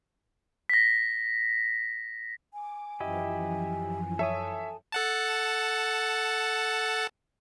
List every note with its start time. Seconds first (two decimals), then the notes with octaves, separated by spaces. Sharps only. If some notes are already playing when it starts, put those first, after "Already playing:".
0.69 A#6 B6
2.53 G#5 D6
3.00 F#2 E3 F3 E4 G4 D#5
4.19 A4 C#5 E5 D#6
4.92 A4 F#5 A5